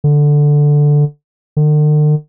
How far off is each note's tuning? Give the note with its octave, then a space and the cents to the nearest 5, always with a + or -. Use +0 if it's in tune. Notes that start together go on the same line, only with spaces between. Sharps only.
D3 +0
D3 +45